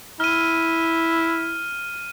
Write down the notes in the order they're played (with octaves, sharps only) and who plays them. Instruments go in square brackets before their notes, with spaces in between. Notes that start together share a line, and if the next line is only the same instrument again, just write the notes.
[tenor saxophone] E4 [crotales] F6 D#7